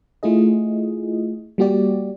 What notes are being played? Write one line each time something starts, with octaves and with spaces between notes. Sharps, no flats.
A3 E4 F4 G#4 D#5
G3 A#3 F#4 G4 D5